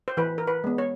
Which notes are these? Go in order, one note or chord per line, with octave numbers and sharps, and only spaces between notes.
C5
E3 B4
A#4
B4
G#3 B3
C#5